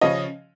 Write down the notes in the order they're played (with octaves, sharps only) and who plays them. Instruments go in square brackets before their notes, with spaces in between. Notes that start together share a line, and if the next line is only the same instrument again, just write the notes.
[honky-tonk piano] C#3 F3 C#4 D#5